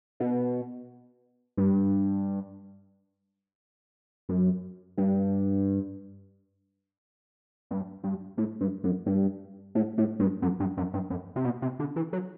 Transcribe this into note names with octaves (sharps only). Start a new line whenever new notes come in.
B2
G2
F#2
G2
G2
G2
A2
G2
F#2
G2
A2
A2
G2
F#2
G2
F#2
G2
F#2
C3
B2
C3
D3
E3
F#3